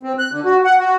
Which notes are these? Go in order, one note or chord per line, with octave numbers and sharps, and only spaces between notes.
C4
F#6
D3
F#4
F#5
F#4